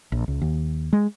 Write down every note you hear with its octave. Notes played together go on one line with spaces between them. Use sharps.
A#1
C#2
D#2
G#3